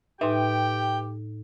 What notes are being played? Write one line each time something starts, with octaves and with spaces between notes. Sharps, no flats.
A2 D#4 G4 B4 E5 G5